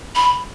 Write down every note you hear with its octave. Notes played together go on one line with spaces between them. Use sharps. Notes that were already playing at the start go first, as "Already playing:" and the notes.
B5